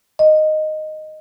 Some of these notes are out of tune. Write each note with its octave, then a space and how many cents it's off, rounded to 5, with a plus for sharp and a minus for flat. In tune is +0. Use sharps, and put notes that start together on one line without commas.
D#5 -5